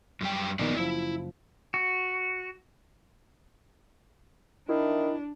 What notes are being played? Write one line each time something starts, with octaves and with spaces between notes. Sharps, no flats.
F#2 G3 G5
A#1 D#3 F#3 B3 D5
F#1 F3 E4
F#4
D#3 D4 E4